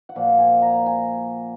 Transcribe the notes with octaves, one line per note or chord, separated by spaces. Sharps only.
F#5
A#2 F3 F5
G#5
A#5
G#5